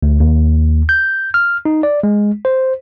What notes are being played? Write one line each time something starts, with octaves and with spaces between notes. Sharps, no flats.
D2
D#2
G6
F6
D#4
D5
G#3
C5